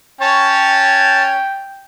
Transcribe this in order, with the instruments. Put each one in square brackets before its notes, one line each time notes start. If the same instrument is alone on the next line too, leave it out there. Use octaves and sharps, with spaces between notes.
[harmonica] C#4 C#5 [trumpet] G5 [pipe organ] A5